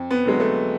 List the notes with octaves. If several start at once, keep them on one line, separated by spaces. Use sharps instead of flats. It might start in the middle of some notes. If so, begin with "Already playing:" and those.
Already playing: F2
B3
D3 F#3 G#3
A3